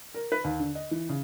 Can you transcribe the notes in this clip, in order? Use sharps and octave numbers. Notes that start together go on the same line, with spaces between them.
A#4
B4
D#2
D3
D#5
E3
C#3